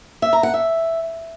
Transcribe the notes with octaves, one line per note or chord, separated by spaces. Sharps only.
E5
A#5
F#5
E5